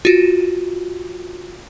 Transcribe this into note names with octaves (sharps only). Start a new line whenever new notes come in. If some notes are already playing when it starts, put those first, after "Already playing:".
F4 F#4